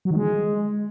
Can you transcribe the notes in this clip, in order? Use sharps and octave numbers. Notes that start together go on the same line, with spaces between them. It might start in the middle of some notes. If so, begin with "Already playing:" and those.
F#3
D#3
G#3